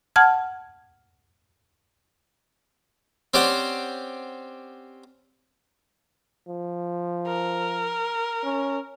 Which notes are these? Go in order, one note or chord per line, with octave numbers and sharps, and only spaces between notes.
F#5 A5 F6 G#6
C4 C#4 G4 C5 D5 F#5
F3
A#4
C#4